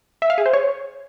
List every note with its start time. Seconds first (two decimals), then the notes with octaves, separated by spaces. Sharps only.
0.22 E5
0.30 F5
0.38 G#4
0.46 C5
0.53 C#5